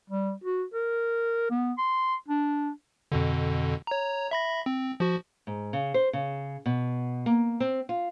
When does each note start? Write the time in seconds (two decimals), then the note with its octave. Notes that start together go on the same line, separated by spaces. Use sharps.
0.10 G3
0.44 F#4
0.74 A#4
1.51 B3
1.78 C6
2.28 D4
3.12 F2 B2 D3
3.87 C#5 A#5
4.31 E5 B5 A#6
4.66 C4
5.00 F3 F#4
5.47 G#2
5.73 C#3
5.94 C5
6.13 C#3
6.66 B2
7.26 A#3
7.60 C4
7.89 F4